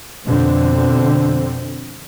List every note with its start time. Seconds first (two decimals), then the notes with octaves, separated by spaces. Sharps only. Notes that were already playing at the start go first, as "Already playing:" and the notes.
0.25 F2 B2 D3 C4